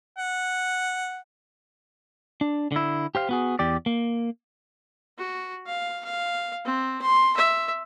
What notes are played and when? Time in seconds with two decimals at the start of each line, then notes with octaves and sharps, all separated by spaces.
0.18 F#5
2.41 D4
2.72 D3 E4
3.15 G4 C5 F5
3.29 B3 F#4 G#4
3.59 E2 G4 D5
3.86 A#3
5.18 F#4
5.67 F5
6.05 F5
6.65 C4
7.02 C6
7.37 E5